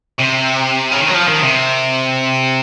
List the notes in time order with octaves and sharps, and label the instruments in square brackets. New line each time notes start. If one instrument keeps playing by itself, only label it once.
[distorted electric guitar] C3
C#3
D#3
F#3
F3
D#3
C3